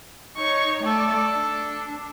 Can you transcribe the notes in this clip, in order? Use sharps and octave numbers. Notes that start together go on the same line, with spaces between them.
D#4 C#5 C#6
A3 A4 D5
D4